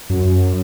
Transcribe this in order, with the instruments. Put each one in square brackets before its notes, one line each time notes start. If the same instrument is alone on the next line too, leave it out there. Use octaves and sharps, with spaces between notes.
[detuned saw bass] F#2